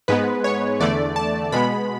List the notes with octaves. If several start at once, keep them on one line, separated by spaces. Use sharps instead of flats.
G#2 G#3 B3 B4
C#5
E2 D3 A3 D5
A5
B2 G#3 B3 B5